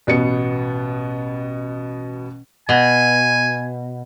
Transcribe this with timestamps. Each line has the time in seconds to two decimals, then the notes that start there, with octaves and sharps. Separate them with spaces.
0.07 A1 B2 B3 C#7
2.69 B2 G#5